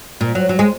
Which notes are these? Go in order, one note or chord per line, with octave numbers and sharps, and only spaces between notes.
A#2
F#3
F#3
G#3